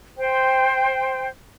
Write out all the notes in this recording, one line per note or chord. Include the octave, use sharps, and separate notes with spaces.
C5 G5